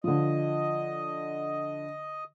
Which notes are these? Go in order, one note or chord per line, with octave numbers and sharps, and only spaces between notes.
D3 F3 D#5